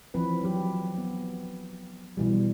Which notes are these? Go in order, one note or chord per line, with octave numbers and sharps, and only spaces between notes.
E3 F3 C4 B4
F#3 G4
B3
B2 E3 G3